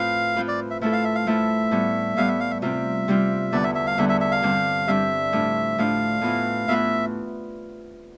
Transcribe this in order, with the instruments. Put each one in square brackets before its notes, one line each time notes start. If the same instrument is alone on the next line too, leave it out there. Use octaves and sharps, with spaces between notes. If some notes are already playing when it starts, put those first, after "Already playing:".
Already playing: [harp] A2 F3 C4 F4 B4 [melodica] F5
[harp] F3 C4 F4 B4
[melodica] D5
E5
[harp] F3 A3 E4 A4 [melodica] E5
[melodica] F5
E5
F5
[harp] F3 A3 E4 A4 [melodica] E5
[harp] A2 G3 B3
[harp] A2 G3 B3 [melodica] F5
[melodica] E5
F5
E5
[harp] C3 G3 C4 F4 [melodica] E5
[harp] C3 G3 C4 F4
[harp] E2 D3 G3 B3 [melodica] D5
[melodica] E5
E5
F5
[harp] E2 D3 G3 B3 [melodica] E5
[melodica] E5
E5
F5
[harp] G2 D3 G3 C4
[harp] G2 D3 G3 C4 [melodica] E5
[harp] A2 F3 A3 D4
[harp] A2 F3 A3 D4 [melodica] F5
[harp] A2 E3 B3 F4 B4
[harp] A2 E3 B3 F4 B4 [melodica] E5